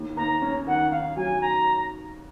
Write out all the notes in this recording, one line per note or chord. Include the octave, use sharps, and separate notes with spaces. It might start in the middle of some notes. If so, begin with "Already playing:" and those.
Already playing: D#2
D#2 A#5
C#4
D#3 F#5
D#3 F5
F#3 G#5
A#5